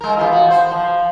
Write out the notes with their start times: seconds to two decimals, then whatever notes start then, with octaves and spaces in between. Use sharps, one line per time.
0.01 G#3 A#4
0.17 E3 B3 F4
0.32 F#4
0.51 C5
0.72 F3